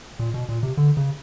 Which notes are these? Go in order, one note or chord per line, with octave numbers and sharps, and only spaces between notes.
A#2
B2
A#2
C3
D3
C#3